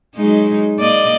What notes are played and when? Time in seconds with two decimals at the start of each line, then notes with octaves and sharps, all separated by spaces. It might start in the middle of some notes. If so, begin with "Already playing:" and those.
0.15 F#3 G#3 D#4
0.78 A#3 D5 D#5